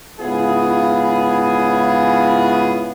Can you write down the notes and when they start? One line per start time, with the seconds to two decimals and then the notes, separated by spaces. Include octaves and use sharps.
0.20 G#2 C#3 B3 E4 F4 G#4